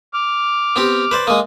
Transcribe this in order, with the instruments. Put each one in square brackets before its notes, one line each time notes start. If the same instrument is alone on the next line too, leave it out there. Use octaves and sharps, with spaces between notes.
[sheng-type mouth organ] D6 F6
[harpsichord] B3 C4 G4
B4 C5 D5
[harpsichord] G#3 A#3 [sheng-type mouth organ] D#6